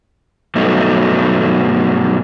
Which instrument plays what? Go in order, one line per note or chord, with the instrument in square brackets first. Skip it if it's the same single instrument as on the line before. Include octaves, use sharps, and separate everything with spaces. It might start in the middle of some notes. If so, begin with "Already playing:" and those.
[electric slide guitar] G2 B2 F#3 A3 D#4